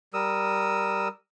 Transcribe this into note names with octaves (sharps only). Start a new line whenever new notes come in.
G3 A#4 D#6 E6